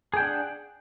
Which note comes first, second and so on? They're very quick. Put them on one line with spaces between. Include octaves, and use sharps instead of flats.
G#4 G5 D4 F#5